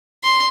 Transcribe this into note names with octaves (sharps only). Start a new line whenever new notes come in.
C6